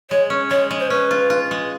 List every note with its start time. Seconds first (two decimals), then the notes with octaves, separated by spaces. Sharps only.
0.11 G#3 C#5
0.30 C#4
0.51 G#3 C#5
0.71 G#3
0.80 C5
0.90 C#4 B4
1.11 F4
1.30 F4
1.51 G#3